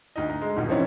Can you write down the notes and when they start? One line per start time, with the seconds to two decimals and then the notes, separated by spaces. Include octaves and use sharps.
0.16 D2 D#4 D#5
0.30 A#5
0.41 G#3
0.56 D#1 B1 G#2
0.69 E3 F3 C4 C#4 D#4 E4